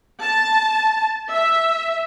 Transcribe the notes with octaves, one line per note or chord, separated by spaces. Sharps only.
A5
E5